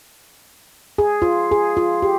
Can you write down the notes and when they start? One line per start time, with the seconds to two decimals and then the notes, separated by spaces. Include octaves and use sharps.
0.98 G#4
1.22 F4
1.52 G#4
1.77 F4
2.02 G4